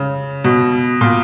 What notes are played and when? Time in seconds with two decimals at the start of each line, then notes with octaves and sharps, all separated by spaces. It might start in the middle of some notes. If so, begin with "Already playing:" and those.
Already playing: C#3
0.44 B2
1.01 A#2